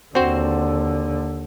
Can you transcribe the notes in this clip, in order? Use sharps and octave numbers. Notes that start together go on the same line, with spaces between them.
D#2 D3 C4 F#4 C5